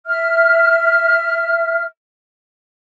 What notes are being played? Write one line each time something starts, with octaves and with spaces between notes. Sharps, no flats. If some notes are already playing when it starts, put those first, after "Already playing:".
E5 F6